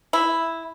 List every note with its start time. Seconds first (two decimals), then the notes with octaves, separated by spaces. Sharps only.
0.13 E4